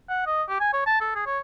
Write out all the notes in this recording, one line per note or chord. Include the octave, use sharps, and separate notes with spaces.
F#5
D#5
G4
G#5
C#5
A5
A4
G#4
C#5